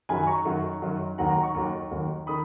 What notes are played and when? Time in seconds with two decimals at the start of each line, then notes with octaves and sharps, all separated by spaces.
0.09 F#2 D#3 F#3 G#5 B5
0.27 A#5 C#6
0.45 F#2 D#3 F#3
0.82 F#2 D#3 F#3
1.18 D#2 D#3 F#3 F#5 A#5
1.31 F#5 A#5
1.43 A#5 C#6
1.55 D#2 D#3 F#3
1.91 D#2 D#3 F#3
2.27 D#3 B5 D#6